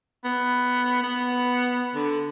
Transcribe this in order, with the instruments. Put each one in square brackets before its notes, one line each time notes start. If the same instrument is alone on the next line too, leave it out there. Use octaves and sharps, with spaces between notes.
[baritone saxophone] B3
B3
D3